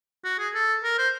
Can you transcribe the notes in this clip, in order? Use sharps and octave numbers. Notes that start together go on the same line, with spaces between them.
F#4
G#4
A4
A#4
C5